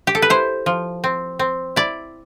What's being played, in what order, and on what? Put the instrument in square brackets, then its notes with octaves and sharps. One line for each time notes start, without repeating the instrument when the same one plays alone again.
[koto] G4
A4
B4
E4 C5
F3
C4
C4
E4 D5